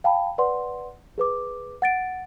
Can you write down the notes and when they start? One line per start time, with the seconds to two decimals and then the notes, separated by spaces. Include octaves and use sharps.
0.04 F5 G5 A5 B5
0.38 B4 D5 F#5 C6
1.18 G#4 B4 D6
1.82 F#5 A6 D7